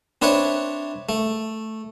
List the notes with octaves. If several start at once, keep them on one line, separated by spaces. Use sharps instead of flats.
C4 D4 B4 C#5 E5
A3